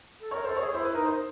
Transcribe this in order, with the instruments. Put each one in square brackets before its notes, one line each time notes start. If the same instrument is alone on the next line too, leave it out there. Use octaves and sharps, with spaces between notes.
[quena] A4
[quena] A#4 [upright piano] C#5
[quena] A4 [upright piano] C5
[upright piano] C#5
[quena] G#4
[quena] E4 [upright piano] C5
[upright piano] B4
[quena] D#4 [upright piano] A#4
[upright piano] C5